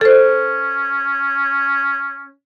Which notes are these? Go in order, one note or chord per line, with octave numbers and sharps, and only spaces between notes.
C#4 A4 C5